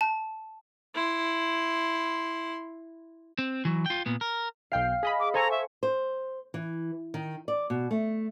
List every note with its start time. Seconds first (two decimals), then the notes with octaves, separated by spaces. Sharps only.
0.01 A5
0.95 E4 C6
3.38 C4
3.65 E3 F#3
3.86 F4 G5
4.06 A#2 B3
4.21 A#4
4.72 B1 F5 G5 C7
5.03 G#4 D#5 B5 B6
5.20 D6
5.34 A4 C5 G#5 A#5 C#6
5.51 E5
5.83 C5
6.54 E3
7.14 D#3
7.48 D5
7.70 B2
7.91 A3